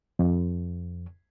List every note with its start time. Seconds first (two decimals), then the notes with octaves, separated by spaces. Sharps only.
0.19 F2